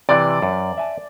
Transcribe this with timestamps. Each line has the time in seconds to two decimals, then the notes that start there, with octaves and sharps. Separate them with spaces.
0.09 C3 E3 D5
0.42 F#2
0.78 E5 G#5 A5